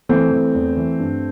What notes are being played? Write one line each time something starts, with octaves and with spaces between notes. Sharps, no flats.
E3 A3 C4
E3
E2
E3
G2